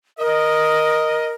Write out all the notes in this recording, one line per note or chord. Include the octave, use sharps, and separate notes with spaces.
A#4 D#5